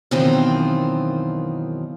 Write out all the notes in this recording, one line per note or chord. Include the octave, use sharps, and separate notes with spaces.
F#2 B2 D#3 E3 C4 F4